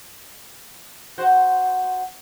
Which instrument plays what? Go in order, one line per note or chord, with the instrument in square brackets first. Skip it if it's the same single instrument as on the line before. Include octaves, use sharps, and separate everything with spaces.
[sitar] F#4 C5